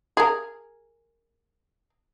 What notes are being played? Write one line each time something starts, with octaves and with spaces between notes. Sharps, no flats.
G#4 A#4